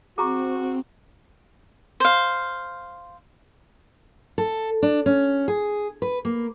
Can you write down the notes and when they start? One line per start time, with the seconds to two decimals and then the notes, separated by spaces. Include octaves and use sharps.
0.18 C4 F#4 G#4 A#5 C#6
2.00 C5 F5
4.38 A4
4.82 D4
5.06 C#4
5.48 G#4
6.02 B4
6.25 A#3